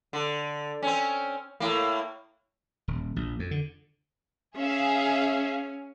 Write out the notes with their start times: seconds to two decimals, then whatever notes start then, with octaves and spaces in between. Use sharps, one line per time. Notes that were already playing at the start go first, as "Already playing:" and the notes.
0.13 D3
0.82 C4 C#4
1.60 A2 A#3
2.88 D#1
3.16 A#1
3.39 F2
3.51 D3
4.56 C#4 G#4 E5 F5